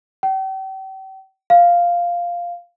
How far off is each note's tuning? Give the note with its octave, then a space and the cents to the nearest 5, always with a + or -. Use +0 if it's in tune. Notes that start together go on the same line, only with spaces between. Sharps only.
G5 -40
F5 +0